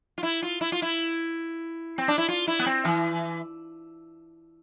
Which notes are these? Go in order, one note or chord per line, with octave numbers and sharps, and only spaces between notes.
F4
E4
F4
E4
F4
E4
C4
D4
E4
F4
E4
B3
C4
E3